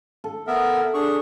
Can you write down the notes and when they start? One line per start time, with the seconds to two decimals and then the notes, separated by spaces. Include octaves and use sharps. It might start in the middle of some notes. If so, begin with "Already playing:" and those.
0.24 A4
0.47 B3 A#4 E5
0.94 D4 G#4 C#6